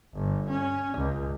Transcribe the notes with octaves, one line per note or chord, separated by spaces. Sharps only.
G1
C#4
C#2